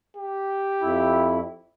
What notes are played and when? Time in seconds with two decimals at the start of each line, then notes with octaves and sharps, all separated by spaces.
0.17 G4
0.82 F2 E4